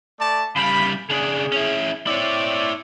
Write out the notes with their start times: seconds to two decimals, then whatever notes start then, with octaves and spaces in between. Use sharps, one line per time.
0.20 A3 D5 A5
0.56 C#3 G3 F5 B5
1.10 C#3 D4 G#4
1.52 C#4 E4
2.07 C4 E4 C#5 D5